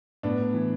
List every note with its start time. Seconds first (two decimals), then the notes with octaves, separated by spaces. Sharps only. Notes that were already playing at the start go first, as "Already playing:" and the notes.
0.23 A2 B3 D4
0.54 E3